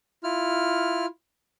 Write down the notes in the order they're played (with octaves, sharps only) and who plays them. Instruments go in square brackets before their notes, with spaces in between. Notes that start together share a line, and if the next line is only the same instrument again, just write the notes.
[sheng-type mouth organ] E4 F4 F6